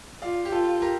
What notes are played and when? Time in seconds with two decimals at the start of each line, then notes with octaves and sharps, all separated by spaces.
0.22 F4 D5 F5
0.45 G4
0.52 F4 A4
0.82 G4 A#4